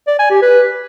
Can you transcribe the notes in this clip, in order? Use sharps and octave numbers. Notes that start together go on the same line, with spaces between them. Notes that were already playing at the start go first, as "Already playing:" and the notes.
D5
G#5
G4
B4